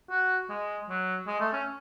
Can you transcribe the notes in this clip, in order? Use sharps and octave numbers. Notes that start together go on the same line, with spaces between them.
F#4
G#3
F#3
G#3
A3
C#4